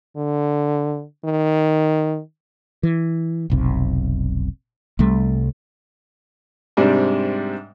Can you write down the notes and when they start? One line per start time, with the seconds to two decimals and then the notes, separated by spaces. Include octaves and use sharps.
0.17 D3
1.25 D#3
2.83 E3
3.50 F1 B1 C3
4.99 C2 C3 G3 A3
6.77 G#2 C3 G3 D4